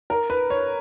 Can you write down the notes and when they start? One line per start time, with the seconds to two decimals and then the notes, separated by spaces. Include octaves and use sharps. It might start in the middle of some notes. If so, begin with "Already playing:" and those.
0.10 A#4
0.30 B4
0.50 C#5